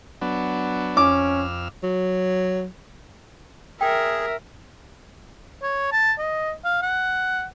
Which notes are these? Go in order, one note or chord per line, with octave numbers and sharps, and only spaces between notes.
F#3 B3 D4
F2 C#4 D6 E6 F6
F#3
G#4 A#4 E5 G5
C#5
A5
D#5
F5
F#5